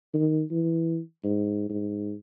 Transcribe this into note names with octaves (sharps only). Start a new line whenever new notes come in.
D#3
E3
G#2
G#2